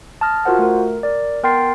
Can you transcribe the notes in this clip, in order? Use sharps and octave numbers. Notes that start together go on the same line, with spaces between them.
A5 D#6 F6 A#6
F4 F#4 A#4 C5 F#5
A3 A#4
A#4 D5
B3 A#4 G5 C6 A6 C7